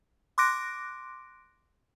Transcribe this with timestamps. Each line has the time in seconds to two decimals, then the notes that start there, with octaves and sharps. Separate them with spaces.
0.38 C6 D6 F#6 A#6 D7